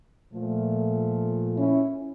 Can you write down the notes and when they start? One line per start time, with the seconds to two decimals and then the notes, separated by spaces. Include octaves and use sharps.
0.33 A#2 F3 A3
1.57 C#4 E4